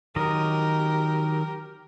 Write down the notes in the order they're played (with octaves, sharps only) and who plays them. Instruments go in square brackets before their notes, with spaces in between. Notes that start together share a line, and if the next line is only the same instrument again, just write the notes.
[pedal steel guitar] D#3 F#3 D#5 [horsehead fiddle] G4 A#4